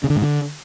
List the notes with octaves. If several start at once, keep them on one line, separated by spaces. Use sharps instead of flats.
C#3
D3
G#2
D3